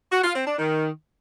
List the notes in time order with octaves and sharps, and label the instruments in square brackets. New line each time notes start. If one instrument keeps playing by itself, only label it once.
[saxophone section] F#4
F4
C4
D4
D#3